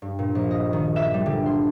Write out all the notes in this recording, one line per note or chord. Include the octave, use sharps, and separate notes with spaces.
G2
A#2
A#1
D#5
D#3
E5
G3
D3
C6